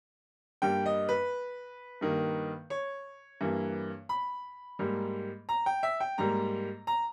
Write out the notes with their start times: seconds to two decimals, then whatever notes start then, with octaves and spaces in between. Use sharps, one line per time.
0.62 G2 G3 A#3 G5
0.86 D#5
1.09 B4
2.01 G2 D#3 A#3
2.70 C#5
3.41 G2 E3 A#3
4.09 B5
4.79 G#2 G3 A#3
5.49 A#5
5.66 G5
5.83 E5
6.00 G5
6.18 G#2 G3 A#3 A#5
6.87 A#5